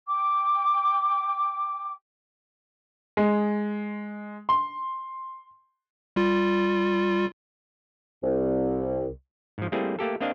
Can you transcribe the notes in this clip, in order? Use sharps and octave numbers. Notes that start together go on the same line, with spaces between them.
G5 D6
G#3
C6
G3 F4
C2
G#2 F3
G3 A3 A#3 C4 E4 G#4
A3 A#3 G4 A4
A#3 C4 D4 D#5 F5